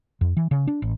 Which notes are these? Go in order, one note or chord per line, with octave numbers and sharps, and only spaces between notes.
F2
E3
C#3
D4
A1